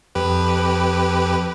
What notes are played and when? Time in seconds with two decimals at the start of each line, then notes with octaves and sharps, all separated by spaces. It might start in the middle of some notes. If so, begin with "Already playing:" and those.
0.15 F2 G4 B4